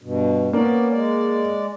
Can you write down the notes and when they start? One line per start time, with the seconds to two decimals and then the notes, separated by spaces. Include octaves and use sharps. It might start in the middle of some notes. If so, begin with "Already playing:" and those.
0.02 G2 B2
0.53 A#3 B3 C#4 D5
0.92 G#3 D5